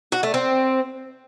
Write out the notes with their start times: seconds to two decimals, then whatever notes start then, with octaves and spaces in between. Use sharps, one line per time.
0.12 F#4
0.23 A3
0.34 C4